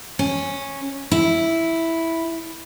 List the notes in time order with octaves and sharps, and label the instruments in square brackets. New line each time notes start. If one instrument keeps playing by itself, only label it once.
[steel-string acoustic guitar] C#4
E4